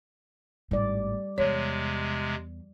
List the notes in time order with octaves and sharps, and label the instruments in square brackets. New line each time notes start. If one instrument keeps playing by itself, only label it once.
[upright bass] G#1 A2 [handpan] G3 D5
[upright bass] E2 [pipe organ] C3 G#3 [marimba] C#5